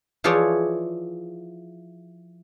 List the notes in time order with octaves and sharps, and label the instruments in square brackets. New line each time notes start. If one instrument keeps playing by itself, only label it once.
[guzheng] E3 F3 F4 G#4 C#5 D5